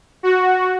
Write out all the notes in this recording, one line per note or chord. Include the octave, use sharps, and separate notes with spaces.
F#4